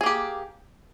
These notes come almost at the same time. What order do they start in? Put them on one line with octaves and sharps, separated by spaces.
G#4 A#3 G4